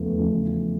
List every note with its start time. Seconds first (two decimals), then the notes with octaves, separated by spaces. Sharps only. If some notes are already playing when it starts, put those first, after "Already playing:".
Already playing: E2 C#3 F3 A3
0.17 E2 C#3 F3 A3